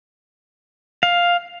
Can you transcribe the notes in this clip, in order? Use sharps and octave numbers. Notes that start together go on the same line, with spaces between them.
F5